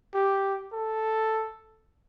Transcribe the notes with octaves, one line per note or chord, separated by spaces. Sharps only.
G4
A4